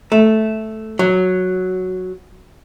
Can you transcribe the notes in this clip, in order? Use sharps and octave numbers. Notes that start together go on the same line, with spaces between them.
A3
F#3